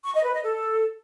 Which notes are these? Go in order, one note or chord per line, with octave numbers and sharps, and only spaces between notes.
C#6
D#5
B4
D#5
A4